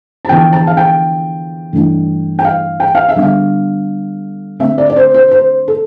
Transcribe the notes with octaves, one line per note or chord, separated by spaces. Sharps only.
A5
E2 D3 F3 B3 D4 G5
A5
F5
G5
G2 E3 A3 D4
G5
F5
G5
F5
E5
D3 G3 B3 D4
F5
D3 A3 C4 E5
D5
D5
C5
C5
C5
A4